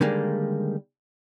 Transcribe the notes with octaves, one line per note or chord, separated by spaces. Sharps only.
D3 D#3 G3 G#3 A#3